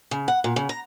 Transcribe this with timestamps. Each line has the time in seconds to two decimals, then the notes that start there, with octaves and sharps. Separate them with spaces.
0.11 C#3
0.28 F#5
0.44 A#2
0.56 C#3
0.69 A#5